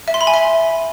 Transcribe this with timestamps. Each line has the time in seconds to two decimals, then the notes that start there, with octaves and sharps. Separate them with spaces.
0.08 E5
0.14 C6
0.21 B5
0.27 G#5
0.34 E5